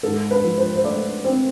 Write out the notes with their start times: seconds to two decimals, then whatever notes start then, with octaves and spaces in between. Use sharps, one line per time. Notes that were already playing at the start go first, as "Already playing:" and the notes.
0.03 G#2 A4
0.31 B4
0.44 F3
0.57 C5
0.76 C5
0.84 A3 D5
1.24 C4 C5